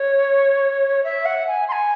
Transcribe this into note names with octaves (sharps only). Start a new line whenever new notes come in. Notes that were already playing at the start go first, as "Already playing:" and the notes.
Already playing: C#5
E5
F#5
G#5
C6
G#5